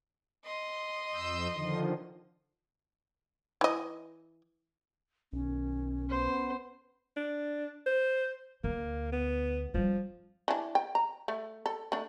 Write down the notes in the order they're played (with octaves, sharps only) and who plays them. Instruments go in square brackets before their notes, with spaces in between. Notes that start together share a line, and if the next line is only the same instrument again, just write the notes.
[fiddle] D#5 C6
[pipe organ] F2 E6 G6
D3 D#3 F3
[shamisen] E3 D#5
[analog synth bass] B1 [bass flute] D#3 [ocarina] C#4
[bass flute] B3 [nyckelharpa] C5
[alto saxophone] D4
C5
[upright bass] D2 [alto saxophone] A#3
[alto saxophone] B3
[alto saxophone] F3 [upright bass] G3 C4
[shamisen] E3 D4
G5
A#5
A3
A4
A3 D4